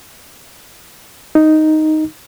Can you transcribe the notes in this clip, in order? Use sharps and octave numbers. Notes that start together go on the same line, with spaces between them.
D#4